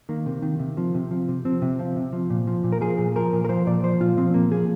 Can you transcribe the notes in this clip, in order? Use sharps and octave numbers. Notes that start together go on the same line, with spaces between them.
D#3 A#3
C3
D#3
C3
F3
C3
F3
C3
F3 C4
C3
F3
C3
F3
A#2
F3
A#2
A#4
F3 G#4
A#2
F3 A#4
A#2
A#4
F3 C5
A#2 D5
F3 C5
A#2 F4
F3 C4
A#2 A#3
F3 G#4